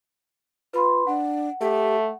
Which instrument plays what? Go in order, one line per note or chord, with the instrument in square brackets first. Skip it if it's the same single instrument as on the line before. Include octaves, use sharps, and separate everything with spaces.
[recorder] F4 [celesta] B4 B5 C6
[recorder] D4 [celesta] F#5
[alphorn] A3 [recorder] G4